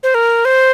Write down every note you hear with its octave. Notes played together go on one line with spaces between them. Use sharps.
C5
A#4
C5